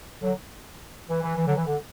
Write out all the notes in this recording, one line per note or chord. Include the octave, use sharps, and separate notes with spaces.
D3 F#3
E3
E3
E3
D3 F#3
E3
D3